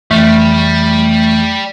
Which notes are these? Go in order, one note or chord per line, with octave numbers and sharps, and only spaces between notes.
F2 E3 G3 A3 F6